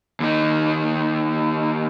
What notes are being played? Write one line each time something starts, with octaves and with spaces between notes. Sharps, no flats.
D#2 D#4